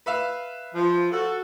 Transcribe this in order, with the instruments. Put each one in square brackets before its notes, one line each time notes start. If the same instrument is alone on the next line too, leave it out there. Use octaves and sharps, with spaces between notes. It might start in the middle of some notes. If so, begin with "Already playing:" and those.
[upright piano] B4 E5 F5
[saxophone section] F3
F#4 A4